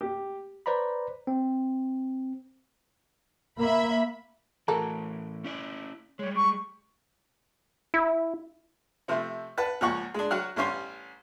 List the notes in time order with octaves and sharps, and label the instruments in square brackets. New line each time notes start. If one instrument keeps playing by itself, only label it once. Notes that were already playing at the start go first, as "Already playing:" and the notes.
[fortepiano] G4
[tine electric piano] B4 C5 D5 A#5 B5
C4
[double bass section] A#3 [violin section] E5 B5
[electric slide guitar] A2 E3 [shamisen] F#4 A4 A#4
[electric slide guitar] C#4 E4 D5
[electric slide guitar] G3 G#3 [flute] C#5
[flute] C#6
[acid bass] E4
[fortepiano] C3 F3 A3 C5
B4 F#5 A5
C#2 A#2 F3 F#5 C#6
G#3 D4
F#3 F#4 F#5 F6
A1 G3 C#4 C5 C6